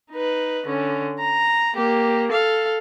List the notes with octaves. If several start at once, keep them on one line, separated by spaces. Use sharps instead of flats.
D#4 B4
D3 C#4
A#5
A#3 G4
A4 F5